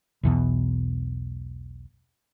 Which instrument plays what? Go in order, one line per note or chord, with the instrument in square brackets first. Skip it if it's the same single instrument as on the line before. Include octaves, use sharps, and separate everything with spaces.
[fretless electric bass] B1 E2 B2